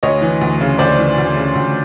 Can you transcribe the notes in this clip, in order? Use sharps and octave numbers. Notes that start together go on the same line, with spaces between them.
D2 C#5 D#5
E3
D2
C#3
D2 C5 D5
E3
D2
C#3
D2